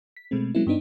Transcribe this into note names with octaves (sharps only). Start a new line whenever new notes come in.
B6
B2 G#3 A3 C4
F#3 G#3 A#3 C4 C#4 E4
G2 B3 D4 D#4